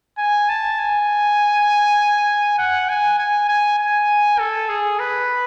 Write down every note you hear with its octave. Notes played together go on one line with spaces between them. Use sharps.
G#5
A5
G#5
F#5
G#5
G#5
G#5
G#5
A4
G#4
B4